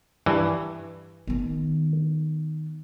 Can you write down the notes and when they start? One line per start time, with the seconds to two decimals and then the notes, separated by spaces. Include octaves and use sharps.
0.26 G2 E3
1.28 D#3 B3